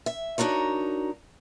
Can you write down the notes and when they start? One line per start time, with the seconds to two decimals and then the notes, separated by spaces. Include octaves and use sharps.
0.06 E5
0.38 D4 D#4 F#4 A#4 C#5